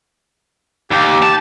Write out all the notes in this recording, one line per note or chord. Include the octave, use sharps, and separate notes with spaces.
D#2 G4
A5